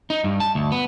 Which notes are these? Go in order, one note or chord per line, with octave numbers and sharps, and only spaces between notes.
D#4
G2
A5
D2
B3